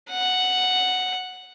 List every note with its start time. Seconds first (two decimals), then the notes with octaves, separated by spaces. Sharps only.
0.11 F#5